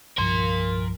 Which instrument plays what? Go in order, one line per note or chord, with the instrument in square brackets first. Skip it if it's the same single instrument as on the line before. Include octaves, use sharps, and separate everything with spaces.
[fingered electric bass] C2 G2 F3 [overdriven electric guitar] A#4 C6